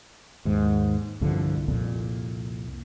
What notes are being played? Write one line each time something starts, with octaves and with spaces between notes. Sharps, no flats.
D#2 G#2
C2 G2 D3 F3
C2 F2 A#2